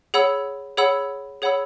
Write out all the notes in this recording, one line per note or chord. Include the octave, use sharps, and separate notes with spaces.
G#4 C#5 F#5 B5 E6
G#4 C#5 F#5 B5 E6
G#4 C#5 F#5 B5 E6